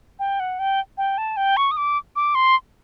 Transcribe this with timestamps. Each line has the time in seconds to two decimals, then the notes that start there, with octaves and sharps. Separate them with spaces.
0.19 G5
0.40 F#5
0.59 G5
0.98 G5
1.18 A5
1.37 G5
1.57 C#6
1.71 D#6
1.77 D6
2.16 D6
2.35 C6